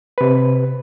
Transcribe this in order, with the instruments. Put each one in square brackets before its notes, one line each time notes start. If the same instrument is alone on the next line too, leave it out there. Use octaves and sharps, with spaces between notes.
[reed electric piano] C3 B4